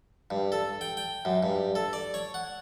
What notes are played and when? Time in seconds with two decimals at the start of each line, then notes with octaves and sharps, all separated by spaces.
0.31 G2
0.52 A4
0.81 G5
0.97 G5
1.25 F#2
1.43 G2
1.75 A4
1.93 D5
2.14 C#5
2.34 F#5